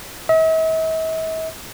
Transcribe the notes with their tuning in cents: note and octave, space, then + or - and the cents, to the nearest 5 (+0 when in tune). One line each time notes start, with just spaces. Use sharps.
E5 -45